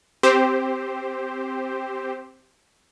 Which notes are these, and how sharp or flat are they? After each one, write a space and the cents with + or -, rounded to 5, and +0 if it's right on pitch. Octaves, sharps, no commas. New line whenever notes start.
C4 +0 G4 +0 C5 +0